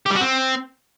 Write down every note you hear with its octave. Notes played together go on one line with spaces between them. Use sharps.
G4
G3
F#4
C4